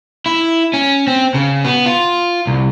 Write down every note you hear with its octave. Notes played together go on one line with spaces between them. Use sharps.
E4
C#4
C4
C#3
B3
F4
C2